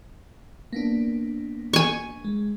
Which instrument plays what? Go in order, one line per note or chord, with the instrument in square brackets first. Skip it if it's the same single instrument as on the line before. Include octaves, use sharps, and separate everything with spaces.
[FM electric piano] A#3 B3 D4
[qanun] G#5 C#6
[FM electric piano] G#3